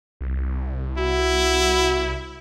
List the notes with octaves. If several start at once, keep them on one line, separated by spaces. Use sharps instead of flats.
C2
E4 F#4